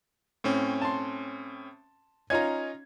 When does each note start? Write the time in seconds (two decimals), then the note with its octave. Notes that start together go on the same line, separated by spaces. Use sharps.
0.44 A2 C4 C#4
0.82 A5 C6
2.30 C#4 D#4 F4 A#5 G#6